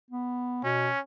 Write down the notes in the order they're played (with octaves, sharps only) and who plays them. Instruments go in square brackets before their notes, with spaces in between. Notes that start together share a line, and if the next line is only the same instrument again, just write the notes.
[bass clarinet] B3
[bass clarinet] B2 [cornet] C#4